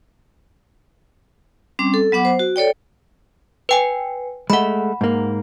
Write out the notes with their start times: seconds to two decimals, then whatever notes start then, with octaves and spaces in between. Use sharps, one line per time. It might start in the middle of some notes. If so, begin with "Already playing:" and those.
1.79 G3 C4 C#4 D6
1.94 A4
2.12 F#3 B3 F#5 D6
2.25 C5
2.39 F#4
2.56 A4 C#5 D5 G5
3.69 B4 G5 G#5
4.50 G#3 A3 F#5 B5
5.01 G#2 A#3